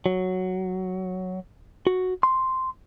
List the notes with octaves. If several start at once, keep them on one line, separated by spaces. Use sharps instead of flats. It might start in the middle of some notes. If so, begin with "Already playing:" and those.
F#3
F#4
C6